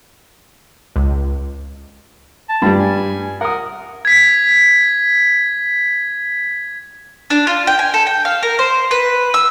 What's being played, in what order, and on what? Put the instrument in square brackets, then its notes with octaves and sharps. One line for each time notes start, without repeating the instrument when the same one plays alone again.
[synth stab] C#2
[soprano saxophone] A5
[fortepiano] G2 G3
[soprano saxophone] G#5
[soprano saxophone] A#4 [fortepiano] F#5 D#6
[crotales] G#6 B6
[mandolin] D4
F4
G5
G#5
A4
G5
F5
A#4
C5
B4
E6